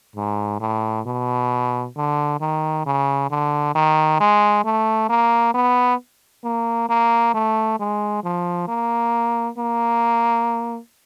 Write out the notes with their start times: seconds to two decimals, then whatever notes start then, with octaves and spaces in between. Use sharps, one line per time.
0.16 G#2
0.61 A2
1.06 B2
1.96 D3
2.40 D#3
2.86 C#3
3.30 D3
3.75 D#3
4.20 G#3
4.65 A3
5.10 A#3
5.54 B3
6.44 A#3
6.89 A#3
7.34 A3
7.79 G#3
8.24 F3
8.68 A#3
9.58 A#3